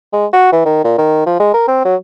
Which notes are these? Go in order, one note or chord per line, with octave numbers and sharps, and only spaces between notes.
G#3
F#4
E3
D#3
A#2
D#3
F3
G#3
A#4
C4
F#3